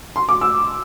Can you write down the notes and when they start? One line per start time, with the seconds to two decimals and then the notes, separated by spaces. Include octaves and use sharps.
0.16 C6
0.29 D6
0.41 E6